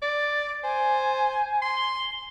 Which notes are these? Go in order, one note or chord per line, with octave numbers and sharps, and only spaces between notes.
D5 A6
C5 G#5
C6
G7